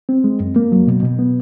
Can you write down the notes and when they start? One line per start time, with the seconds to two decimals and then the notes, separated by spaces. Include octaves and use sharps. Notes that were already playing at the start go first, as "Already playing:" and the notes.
0.09 C4
0.24 G#3
0.40 F#2
0.56 A#3
0.72 F#3
0.87 B2
1.03 B2
1.19 B3